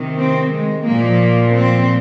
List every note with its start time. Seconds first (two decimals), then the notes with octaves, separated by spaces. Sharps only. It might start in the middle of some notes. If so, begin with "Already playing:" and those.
Already playing: C3 D#3
0.18 C4
0.52 G#3
0.85 A#2 F3 A#3
1.53 C4